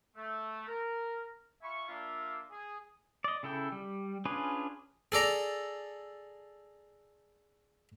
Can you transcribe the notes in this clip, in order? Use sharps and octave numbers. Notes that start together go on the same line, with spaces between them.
A3
A#4
F4 E5 G#5 B5 C#6
A#3 D4 F4 E5
G#4
D5 D#5
C#3 E4 A4 G5
G3
C#4 D4 F4 G#4 B4
G#4 A4 D5 A#5